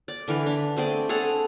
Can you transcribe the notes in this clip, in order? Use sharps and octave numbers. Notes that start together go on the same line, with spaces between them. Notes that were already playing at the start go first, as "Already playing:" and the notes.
D5
D3 E3 A#4 B4
D4
A3 C4 G#4 D5
G#4 A4 F#5 A#5